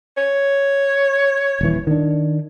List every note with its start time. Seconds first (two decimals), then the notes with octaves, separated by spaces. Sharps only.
0.17 C#5
1.61 D#1 E3
1.87 D#3 D4